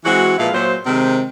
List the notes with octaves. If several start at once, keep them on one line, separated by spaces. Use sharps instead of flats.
E3 G#3 C4 F#4
A#2 F3 G#3 E4 B4 F5
A#2 F#3 C5
C3 D#3 G#3 C4